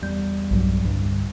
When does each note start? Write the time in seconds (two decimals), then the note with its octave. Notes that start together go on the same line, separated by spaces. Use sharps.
0.02 E2 G3 G6
0.51 B1 G2 F#3
0.84 C2 G2 D3